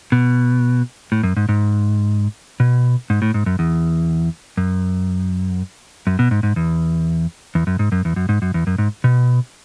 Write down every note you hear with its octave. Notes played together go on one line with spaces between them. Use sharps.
B2
A2
F#2
G#2
G#2
B2
G#2
A2
G#2
F#2
E2
F#2
F#2
B2
G#2
G#2
E2
E2
F#2
G#2
F#2
E2
F#2
G#2
F#2
E2
F#2
G#2
B2